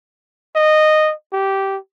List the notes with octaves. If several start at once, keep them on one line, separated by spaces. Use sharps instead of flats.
D#5
G4